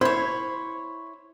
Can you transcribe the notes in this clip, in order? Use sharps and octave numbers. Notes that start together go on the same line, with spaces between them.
E4 C5 C#5